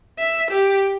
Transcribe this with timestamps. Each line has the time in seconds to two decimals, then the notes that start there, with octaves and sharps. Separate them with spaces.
0.18 E5
0.51 G4